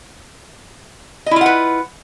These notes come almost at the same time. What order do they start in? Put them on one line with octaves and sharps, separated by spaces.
D#5 E4 F4 F#5 B4